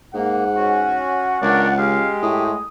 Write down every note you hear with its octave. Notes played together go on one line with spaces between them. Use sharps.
G#2 A#3 F#5
C#4 F#4
C#2 D4 A#4 C#5 D5
G#3 G4 F5
A2 D#6